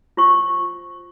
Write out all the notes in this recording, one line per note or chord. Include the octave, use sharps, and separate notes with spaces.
F4 C5 C#6